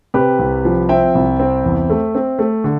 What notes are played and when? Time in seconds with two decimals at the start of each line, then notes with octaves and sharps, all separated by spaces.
0.14 C3 G4 B4
0.39 C2
0.65 F3
0.89 C4 E5 G5
1.15 C2
1.40 C4
1.64 E2
1.90 A3
2.15 C4
2.39 A3
2.64 D3